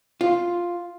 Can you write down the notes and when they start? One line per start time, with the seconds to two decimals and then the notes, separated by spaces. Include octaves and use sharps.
0.21 F4